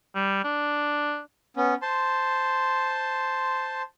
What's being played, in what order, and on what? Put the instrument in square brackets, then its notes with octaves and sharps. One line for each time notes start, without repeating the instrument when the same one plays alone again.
[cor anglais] G3
D4
[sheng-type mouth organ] B3 C#4
C5 A5 C6